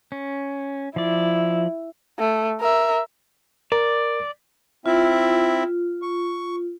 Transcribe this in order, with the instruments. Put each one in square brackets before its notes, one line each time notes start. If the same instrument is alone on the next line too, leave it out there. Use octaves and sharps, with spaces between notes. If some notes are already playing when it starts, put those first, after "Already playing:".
[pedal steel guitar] C#4
[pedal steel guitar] F3 D5 [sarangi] E4
[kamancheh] A3
A#4 E5
[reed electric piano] A#4 [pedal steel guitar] D5
[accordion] C4 E4 E5 [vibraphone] F4
[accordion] C#6